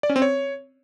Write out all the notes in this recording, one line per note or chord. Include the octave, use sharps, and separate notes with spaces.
D5
C#4
C4
C#5